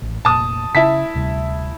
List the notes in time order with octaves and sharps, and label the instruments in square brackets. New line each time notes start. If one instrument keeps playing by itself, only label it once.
[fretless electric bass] A1
[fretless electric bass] F1 A#2 [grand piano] A5 D#6
[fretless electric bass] C#3 [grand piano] E4 A5 B6
[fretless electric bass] D2 C3 G3